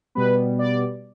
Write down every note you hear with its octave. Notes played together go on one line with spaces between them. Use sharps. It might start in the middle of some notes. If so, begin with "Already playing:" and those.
B2 G3 B3 B4
D5